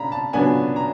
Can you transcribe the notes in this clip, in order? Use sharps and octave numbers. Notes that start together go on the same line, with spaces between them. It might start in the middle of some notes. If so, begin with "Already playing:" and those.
Already playing: C#3 D4 A#5 B5
A5
F2 C#3 F#3 B3 D4 G#5
A#5